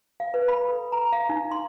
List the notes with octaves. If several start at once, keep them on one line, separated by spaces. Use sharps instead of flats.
F5
B4
B5
A4
A#5
F5
D#4
C6